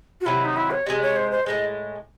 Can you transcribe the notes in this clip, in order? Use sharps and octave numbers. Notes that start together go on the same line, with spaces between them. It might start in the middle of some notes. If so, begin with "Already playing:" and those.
F#4
C3 D#3 F#3 E4
D#4
E4
C#5
C3 D#3 G#3 D#5
C#5
C5
C5
A2 E3 G#3 D#5